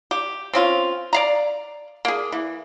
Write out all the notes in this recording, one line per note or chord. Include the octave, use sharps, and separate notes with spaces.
G4
C4 C#4 F4
D5 F5 A#5
A#3 G#4
E3